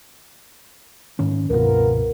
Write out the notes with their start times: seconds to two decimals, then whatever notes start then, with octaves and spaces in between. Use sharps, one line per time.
1.19 G#2 D#3 C#4
1.50 C#2 G2 B2 B3 F4 A#4